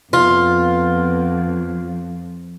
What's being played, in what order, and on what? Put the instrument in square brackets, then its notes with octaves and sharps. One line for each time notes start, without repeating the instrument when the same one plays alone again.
[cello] F2 [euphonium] B3 [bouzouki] F4